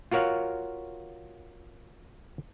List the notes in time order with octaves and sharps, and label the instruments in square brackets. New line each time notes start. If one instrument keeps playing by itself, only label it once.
[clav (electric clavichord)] F4 F#4 A#4 C#5 F5 F#5